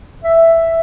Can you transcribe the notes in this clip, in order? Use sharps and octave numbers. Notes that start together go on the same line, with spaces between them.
E5